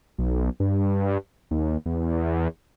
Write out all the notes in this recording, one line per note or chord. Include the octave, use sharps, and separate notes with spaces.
B1
G2
D#2
E2